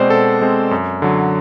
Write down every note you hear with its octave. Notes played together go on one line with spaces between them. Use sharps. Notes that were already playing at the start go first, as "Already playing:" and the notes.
Already playing: B2 G#3 C4 C5 D5
B2 A4
G#3 C4
F#2
D3 F#3